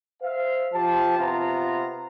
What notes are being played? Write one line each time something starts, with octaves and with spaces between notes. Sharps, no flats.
C5 E5 F5
F3 G4 A5
C3 B3 F4 A#5